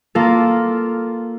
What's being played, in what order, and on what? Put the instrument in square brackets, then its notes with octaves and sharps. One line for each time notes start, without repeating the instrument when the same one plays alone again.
[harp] A#3 F4 A4